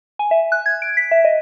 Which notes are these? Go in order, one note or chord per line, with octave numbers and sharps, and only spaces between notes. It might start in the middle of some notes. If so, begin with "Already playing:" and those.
G#5
E5
F#6
G#6
D7
B6
E5
D#5